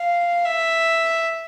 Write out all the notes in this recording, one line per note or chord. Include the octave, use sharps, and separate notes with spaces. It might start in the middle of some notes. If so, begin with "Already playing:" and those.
Already playing: F5
E5